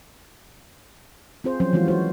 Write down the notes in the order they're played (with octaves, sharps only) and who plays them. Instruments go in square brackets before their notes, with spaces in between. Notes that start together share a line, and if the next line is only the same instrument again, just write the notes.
[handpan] C4 F4 G#4 C5
F3 F#3 C#4 C5
E3 F3 G#3 F4 F#4
F#3 F#4 C5 C#5